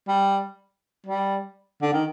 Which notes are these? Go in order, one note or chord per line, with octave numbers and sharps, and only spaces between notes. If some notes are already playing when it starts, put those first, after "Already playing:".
G3
G3
D3
D#3